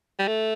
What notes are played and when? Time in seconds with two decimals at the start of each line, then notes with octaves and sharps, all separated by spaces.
0.19 G3
0.28 A3